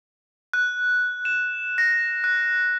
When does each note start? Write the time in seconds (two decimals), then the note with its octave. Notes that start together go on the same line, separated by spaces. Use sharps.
0.53 F#6
1.25 E7
1.78 A#6
2.24 F#6